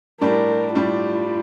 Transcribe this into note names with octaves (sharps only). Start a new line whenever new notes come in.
A2 G3 D4 G4 A#4
A2 G3 D4 F4 G4